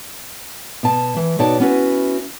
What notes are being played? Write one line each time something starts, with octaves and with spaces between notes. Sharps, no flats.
B2 A5
E3
B2 D#4 F#4 C#5 D5 A5
B3 C#4 E4 F#4 G4 B4